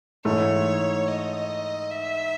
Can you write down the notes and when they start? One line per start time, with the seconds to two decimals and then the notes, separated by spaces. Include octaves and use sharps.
0.25 G#2 E3 A3 C#5
1.08 D#5
1.91 E5